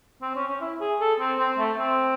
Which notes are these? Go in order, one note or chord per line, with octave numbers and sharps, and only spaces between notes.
C4
C#4
C#4
E4
G#4
A4
C4
C4
A3
C4